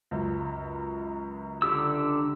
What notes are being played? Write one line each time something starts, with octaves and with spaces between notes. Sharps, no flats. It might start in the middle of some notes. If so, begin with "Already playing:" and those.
C#2 F#2
D3 G4 E6